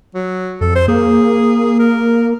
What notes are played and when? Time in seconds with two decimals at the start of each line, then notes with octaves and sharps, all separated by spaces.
0.15 F#3
0.61 F2 A4
0.75 C5
0.88 A#3 G#4
1.79 A#4